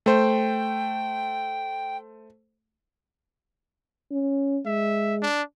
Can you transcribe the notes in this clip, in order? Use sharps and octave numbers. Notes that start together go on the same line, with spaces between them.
A3 C5 G5
C#4
G#3 E5
D4